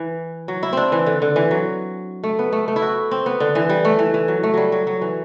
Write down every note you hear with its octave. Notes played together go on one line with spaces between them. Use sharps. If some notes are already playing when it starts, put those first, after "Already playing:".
Already playing: E3
F#3
E4
C4 D4
E3
D3
D3
E3
F#3
A3
B3
A3
A3
E4
F#4
C4
B3
D3
E3
G3
A3
E3
E3
F#3
A3
F#3 G3
F#3
F#3
E3